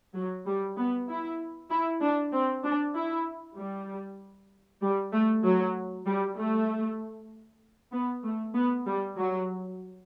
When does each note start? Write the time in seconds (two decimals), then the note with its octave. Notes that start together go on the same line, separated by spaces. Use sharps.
0.15 F#3
0.46 G3
0.78 B3
1.09 E4
1.70 E4
2.01 D4
2.32 C4
2.64 D4
2.95 E4
3.56 G3
4.81 G3
5.12 A3
5.44 F#3
6.06 G3
6.37 A3
7.92 B3
8.23 A3
8.54 B3
8.86 G3
9.17 F#3